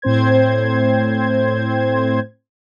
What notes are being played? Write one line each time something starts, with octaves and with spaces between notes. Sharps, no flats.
A2 C4 C5 G#6